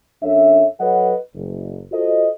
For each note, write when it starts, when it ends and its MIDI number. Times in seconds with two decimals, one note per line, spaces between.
0.23 0.65 42
0.23 0.65 62
0.23 0.65 69
0.23 0.65 73
0.23 0.65 76
0.80 1.14 54
0.80 1.14 69
0.80 1.14 71
0.80 1.14 73
0.80 1.14 75
0.80 1.14 78
1.35 1.82 30
1.92 2.28 65
1.92 2.28 66
1.92 2.28 69
1.92 2.28 72
1.92 2.28 75